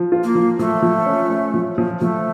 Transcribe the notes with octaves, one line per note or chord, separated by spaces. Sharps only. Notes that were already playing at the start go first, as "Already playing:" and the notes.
Already playing: F3
F4
A#3
F3
F3 A3
F3
C#4
C#4
F3
F3
F3 A3